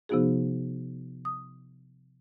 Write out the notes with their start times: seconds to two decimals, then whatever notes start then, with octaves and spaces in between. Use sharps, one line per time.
0.09 C3 F3 B3 D#4 F#4 G#4
1.25 D#6